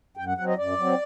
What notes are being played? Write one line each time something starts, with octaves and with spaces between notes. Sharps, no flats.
F#2 G5
F#5
F#3 C4 F#5
D#5
F#2 D5
F#3 C4